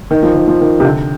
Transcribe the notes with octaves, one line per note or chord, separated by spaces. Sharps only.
D#3
F3
D#3
F3
D#3
C3
D3